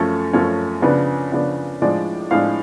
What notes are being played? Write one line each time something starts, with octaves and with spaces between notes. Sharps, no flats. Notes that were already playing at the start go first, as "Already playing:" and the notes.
Already playing: F#2 F3 A3 C#4 A4
F#2 F3 A3 C#4
C#3 F3 B3 D4 B4
C#3 F3 B3 D4
A2 F3 G#3 D4 D5
A2 F3 G#3 D4 F5